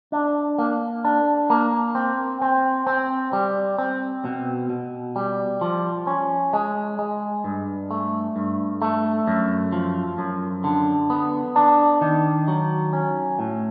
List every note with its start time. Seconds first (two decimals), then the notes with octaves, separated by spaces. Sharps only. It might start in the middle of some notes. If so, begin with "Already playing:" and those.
0.12 D4
0.58 A#3
1.05 D4
1.50 A#3
1.95 C4
2.42 C4
2.87 C4
3.33 G3
3.78 C4
4.25 B2
4.70 B2
5.16 G3
5.61 F3
6.07 C#4
6.53 G#3
6.99 G#3
7.44 G2
7.91 A3
8.36 G2
8.82 A3
9.28 F#2
9.72 F3
10.18 F#2
10.64 D3
11.10 B3
11.56 D4
12.01 D#3
12.48 F#3
12.93 C#4
13.39 A2